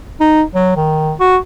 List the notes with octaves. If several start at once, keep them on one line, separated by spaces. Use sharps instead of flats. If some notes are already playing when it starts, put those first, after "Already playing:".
D#4
F#3
D#3
F#4